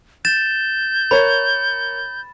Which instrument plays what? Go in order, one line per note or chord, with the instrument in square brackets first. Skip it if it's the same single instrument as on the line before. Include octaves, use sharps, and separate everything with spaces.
[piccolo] G6 [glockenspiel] A6 E7
[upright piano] A#4 C#5 [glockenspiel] B5